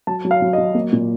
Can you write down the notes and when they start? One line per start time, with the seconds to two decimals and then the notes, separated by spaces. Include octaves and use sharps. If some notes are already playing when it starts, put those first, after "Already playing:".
0.07 F#3 A5
0.25 F#3
0.31 F5
0.42 F#3
0.53 F#3 D#5
0.75 A#3
0.93 A#2